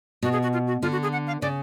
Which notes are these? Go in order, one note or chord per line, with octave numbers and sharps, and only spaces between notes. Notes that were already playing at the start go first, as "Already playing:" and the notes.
B2 F#4
G#4
F#4
F4
F#4
D3 F4
F#4
G#4
F#5
F5
C#3 D5